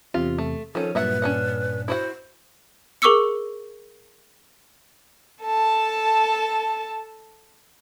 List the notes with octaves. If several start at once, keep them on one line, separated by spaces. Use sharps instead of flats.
E2 C3 F4
A3
D#3 F3 C#4 A4
G2 A#2 F#3 B4 E5 F#5
C#4 D4 F#5
E4 F#4 C5 F#5
G#4 A#4 C#6 D6 E6 C#7
A4 A5